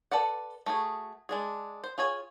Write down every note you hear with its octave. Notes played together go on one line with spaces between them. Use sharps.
A4 B4 D5 F#5
A3 F#4 G#4
G#3 D4 G#4
C5
F4 G#4 C#5 G#5